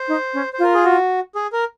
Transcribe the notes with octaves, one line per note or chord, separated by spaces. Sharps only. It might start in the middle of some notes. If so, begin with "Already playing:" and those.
Already playing: C5
D#4
C#4
C5
F4 A#4
G#4
F#4
G#4
A#4